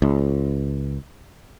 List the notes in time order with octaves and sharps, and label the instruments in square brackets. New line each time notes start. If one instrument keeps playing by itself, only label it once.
[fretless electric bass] C#2